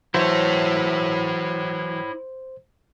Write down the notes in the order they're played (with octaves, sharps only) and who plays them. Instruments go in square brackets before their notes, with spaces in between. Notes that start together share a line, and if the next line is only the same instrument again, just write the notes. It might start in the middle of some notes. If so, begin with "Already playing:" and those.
[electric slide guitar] E3 F#3 [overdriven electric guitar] E4 C#5 [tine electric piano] C5